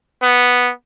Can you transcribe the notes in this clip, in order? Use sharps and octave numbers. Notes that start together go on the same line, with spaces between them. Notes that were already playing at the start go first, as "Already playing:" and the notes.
B3